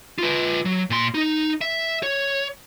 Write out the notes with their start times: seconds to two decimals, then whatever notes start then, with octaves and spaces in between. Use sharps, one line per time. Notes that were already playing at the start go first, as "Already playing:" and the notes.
0.18 F4 B4
0.65 F#3
0.90 A#2 C6
1.14 D#4
1.61 E5
2.03 C#5